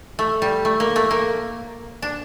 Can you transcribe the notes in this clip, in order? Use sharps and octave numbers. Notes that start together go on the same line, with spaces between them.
A3
G3
A3
A#3
A3
A#3
D4